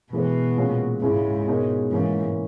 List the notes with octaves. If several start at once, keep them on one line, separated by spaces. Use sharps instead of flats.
B2 E3 G#3 B3 F#4 B4
A#2 G#3 C#4 F#4 C#5
C#2 G#2 C#3 G#3 C#4 E4
B2 G#3 D#4 A#4 C#5
G#2 E3 A#3 C#4